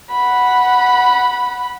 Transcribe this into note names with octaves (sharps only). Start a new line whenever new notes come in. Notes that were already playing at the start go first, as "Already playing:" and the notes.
F#5 B5